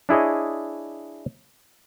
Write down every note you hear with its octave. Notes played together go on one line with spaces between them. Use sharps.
D4 E4 G#4 C#5 D#5